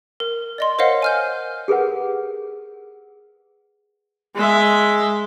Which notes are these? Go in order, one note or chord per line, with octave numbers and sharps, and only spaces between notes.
A#4
D5 D#5 C6
A#4 C5 C#5 D#5 F5 F#5
G#5 F6 G6
G4 G#4 A#4 B4 F#5
G#3 E5